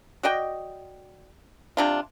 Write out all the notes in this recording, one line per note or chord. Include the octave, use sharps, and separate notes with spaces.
F#4 D5 D#5 G5
C3 D4 F4